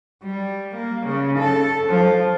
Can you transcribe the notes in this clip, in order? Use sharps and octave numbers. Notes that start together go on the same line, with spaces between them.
G3
A#3
C#3
A4
F3